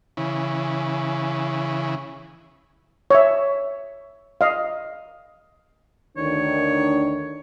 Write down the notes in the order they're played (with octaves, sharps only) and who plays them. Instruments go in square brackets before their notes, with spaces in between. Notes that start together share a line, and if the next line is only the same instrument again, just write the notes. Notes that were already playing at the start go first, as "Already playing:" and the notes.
[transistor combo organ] C#3 E3
[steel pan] C#5 E5
D#5 F5
[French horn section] D2 D#3 D4 [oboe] C#5